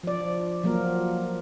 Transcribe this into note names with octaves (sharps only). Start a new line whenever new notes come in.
F3 D5
F3 F#3 A#3 A#4